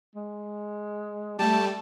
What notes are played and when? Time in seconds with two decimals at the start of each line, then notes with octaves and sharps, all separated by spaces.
0.16 G#3
1.39 G3 A3 G4 A5